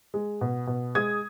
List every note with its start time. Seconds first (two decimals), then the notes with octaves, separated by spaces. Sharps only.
0.14 G#3
0.41 B2
0.67 B2
0.95 G#3 D#6 G#6